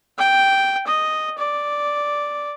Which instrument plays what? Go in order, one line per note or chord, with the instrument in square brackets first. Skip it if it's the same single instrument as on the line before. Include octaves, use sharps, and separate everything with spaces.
[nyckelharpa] G5
D#5
D5